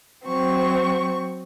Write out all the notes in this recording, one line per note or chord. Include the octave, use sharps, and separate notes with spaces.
F#3 C4 C#6